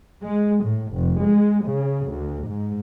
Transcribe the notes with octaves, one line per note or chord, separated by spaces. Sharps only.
G#3
A2
F1
G#3
C#3
D2
G#2